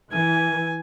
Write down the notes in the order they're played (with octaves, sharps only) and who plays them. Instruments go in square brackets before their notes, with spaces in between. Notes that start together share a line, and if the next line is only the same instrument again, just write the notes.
[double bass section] E3 [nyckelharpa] G#5